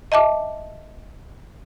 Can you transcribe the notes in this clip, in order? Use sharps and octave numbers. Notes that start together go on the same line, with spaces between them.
D#5 E5 A5 D6